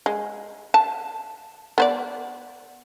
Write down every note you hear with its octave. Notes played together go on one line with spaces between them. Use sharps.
G#3
A5
B3 C5 D5